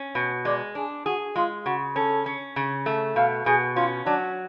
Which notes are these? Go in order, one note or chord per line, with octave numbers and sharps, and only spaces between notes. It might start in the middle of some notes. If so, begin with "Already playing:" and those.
Already playing: C#4
B2
G#3 D5
D4 G#4
F#4 G#4
G#3 F4
C#3 F#4
C#4 A4
C#4
C#3
A3
B2 F5
B2 G#4
C#4 F4
F#3 D4